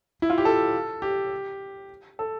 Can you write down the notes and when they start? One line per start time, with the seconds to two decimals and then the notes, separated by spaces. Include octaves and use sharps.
0.22 E4
0.30 F4
0.38 G4
0.45 A4
1.02 G4
2.19 A4